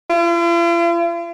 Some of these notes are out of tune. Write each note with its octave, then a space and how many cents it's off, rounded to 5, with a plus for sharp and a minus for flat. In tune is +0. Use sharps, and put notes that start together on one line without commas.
F4 -45